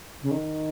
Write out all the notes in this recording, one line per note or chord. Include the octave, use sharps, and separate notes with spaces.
C#3
D#3